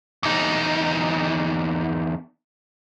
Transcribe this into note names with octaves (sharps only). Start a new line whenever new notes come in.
E2 D#4